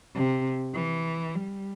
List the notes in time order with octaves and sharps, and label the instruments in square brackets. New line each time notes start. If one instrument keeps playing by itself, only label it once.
[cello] C3
E3
G3